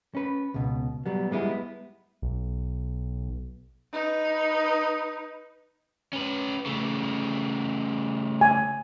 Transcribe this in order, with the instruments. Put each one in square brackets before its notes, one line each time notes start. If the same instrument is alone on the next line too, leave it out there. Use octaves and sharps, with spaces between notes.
[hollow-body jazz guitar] C#4 B4
C#2 B2
F#3 G3 B3
G3 G#3 B3 E4
[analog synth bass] B1
[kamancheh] D#4 B4
[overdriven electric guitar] C#4 B4
C#3 A3
[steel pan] G#5